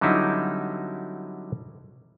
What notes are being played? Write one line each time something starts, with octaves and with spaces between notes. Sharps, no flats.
D3 F#3 G3 C4 D#4 E4